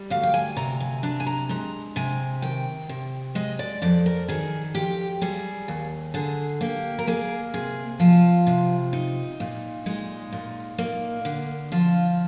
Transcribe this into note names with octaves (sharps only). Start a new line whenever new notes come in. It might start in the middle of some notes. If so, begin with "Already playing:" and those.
Already playing: G3
D2 F5
G5
G#5
C3 A#5
G#5
D4 A#5
G#5
A#5
G#3 A#5
C3 G#5
D#3 G5
C3
G#3 D#5
D5
F2 D5
A#4
D#3 G#4
F2 G4
G3 G#4
D#2
D3 G#4
A#3 G4
A#4
A#3 G#4
C3 G#4
F3 F4
C3
D#4
A#2
G#3 D#4
A#2
A#3
D3
F3 F4